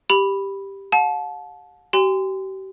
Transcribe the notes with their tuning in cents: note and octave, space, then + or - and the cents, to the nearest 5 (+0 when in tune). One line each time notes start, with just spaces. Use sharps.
G4 +0 B5 +0
F#5 -45 A5 -25
G4 -40 G#5 -45 C6 -30